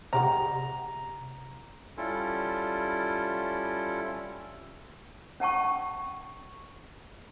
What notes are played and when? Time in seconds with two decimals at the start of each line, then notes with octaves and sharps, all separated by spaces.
0.13 C3 G#3 G4 F#5 A#5
1.97 G3 C#4 E4 F4 A4
5.40 C#4 F#5 A5 C#6